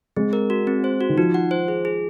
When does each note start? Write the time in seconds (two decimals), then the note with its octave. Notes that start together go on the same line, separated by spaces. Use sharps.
0.16 G#3 C4
0.33 A#4
0.50 F#4
0.67 C4
0.84 C5
1.01 F#4
1.09 D#3
1.17 F3 D#4
1.34 F#5
1.51 C5
1.68 G#4
1.85 G#4